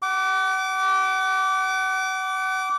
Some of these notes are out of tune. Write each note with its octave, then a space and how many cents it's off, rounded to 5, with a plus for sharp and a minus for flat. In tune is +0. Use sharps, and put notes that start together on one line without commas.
F#5 +35 D6 -20